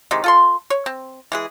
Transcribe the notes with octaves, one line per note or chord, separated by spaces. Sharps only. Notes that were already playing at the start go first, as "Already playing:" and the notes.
C3 D#3 E3 G#3
F4 A4 C6
C#5
C4
E3 G#3 G#4